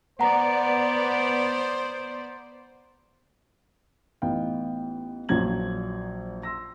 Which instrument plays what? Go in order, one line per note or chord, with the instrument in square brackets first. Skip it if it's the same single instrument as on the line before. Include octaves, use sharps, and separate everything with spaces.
[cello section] B3 D5 [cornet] C5 [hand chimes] F#5 A#5
[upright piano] A1 B3 D#4 F5 G5
A#1 A#2 F3 F#3 G#6 F#7
C6 E6 A#6